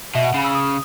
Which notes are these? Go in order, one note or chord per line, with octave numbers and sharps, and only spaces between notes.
B2 E5
F#5
C#3 B5
E6
D#6